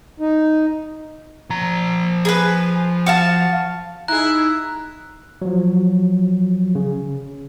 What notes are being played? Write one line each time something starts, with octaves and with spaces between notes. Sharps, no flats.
D#4
F3 A#5
G#4 A#4 B4
F#4 F5 A5
D#4 E4 G#4 A#5 F#6
F3 F#3
C#3